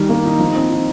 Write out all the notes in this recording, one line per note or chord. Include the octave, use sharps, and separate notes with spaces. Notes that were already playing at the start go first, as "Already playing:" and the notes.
Already playing: D#3 G3
A#3
D#4
F3
C4
D#4